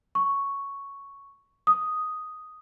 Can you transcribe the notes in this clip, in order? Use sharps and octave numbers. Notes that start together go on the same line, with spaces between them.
C#6
D#6